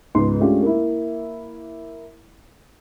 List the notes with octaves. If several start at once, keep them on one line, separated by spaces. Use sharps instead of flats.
C#2 G#2 B3 D#4 C6
G#3 A3 C#4 D4 F4 G4
A#3 E4